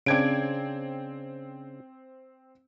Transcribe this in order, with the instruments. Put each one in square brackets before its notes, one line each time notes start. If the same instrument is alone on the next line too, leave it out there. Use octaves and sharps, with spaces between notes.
[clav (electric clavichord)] C#3 D4 [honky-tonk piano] C4 G#6 D7